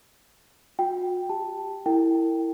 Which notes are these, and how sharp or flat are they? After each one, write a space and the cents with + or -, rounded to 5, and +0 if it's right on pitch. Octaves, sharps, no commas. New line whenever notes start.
F#4 -40 G5 +0
G4 +0 A5 +0
E4 +0 A#4 -35 G5 +0